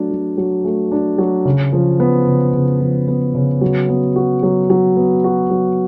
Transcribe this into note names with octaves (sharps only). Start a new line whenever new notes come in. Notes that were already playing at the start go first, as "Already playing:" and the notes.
Already playing: F#3 A3 D4
F#3
F#3
A3
D4
F#3
C#3
F3
B3
C#3
C#3
F3
B3
C#3
F#3
B3
F#4
F#3
F#3
B3
F#4
F#3